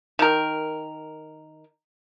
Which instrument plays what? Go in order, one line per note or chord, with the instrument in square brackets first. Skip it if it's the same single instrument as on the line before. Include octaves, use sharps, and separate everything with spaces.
[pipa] D#3 A#4